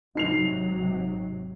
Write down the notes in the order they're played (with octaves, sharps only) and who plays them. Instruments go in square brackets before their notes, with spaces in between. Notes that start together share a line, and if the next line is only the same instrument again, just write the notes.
[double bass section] G#1 C3 F#3 [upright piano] D#4 C7 F7